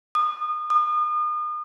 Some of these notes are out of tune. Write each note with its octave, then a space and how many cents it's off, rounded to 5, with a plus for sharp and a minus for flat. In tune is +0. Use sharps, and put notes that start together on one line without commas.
D#6 -30
D#6 -40